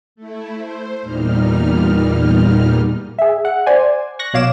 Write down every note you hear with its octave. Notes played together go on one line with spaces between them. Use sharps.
A3 E4
C5
E2 A#2 G3 D#4 F6
G#4 E5
F#5
C5 D5 G#5
C#6 F#6 A#6
B1 B2 C#5 F5 D6 E7